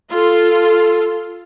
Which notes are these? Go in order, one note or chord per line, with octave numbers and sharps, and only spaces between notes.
F4 A4